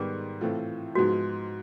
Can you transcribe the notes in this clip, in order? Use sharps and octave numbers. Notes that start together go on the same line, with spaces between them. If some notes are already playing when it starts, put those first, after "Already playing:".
Already playing: G#2 D#3 G3 B3 G#4
A2 E3 A3 C4 F4
G#2 F3 G#3 B3 F#4